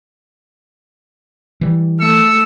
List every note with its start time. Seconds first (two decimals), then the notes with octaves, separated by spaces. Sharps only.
1.61 E3 G3
2.01 A3 E6 C#7